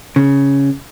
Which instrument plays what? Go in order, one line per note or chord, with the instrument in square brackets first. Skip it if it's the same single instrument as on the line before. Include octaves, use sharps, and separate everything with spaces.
[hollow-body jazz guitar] C#3